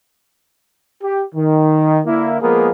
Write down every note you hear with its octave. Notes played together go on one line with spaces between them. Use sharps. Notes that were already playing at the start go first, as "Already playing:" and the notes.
G4
D#3
D3 A#3 E4
F3 G#3 A#3 B3 G#4 A#4